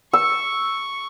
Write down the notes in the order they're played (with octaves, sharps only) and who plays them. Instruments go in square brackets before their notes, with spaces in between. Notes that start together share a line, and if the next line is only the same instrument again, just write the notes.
[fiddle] C#6 [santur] E6